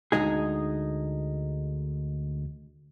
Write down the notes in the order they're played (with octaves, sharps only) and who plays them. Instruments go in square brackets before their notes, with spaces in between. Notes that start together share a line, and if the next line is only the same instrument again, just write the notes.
[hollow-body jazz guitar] D2 G#3 D#4 G#4